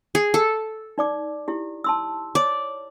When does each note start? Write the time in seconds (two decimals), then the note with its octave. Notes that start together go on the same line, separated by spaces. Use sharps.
0.15 G#4
0.34 A4
0.98 D#4 D5 D6
1.48 E4 G4
1.84 A5 C6 E6
2.35 C#5 D5